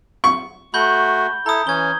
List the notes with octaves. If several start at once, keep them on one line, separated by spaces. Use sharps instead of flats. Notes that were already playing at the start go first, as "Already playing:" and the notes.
C#6
A3 F#4 B5 G6 G7
E4 A4 A#5 D#6
E3 C#4 G#6 G7